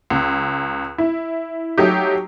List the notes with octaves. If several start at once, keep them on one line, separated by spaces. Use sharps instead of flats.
C#2
E4
F#3 A3 D#4 G4